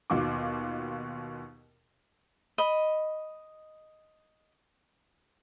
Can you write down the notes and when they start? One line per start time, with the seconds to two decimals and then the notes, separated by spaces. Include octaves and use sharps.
0.10 D#2 B2 F4 F#4 D6
2.58 D#5 B5